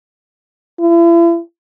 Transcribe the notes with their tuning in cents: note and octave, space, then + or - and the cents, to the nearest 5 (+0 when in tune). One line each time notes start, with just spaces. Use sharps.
E4 +40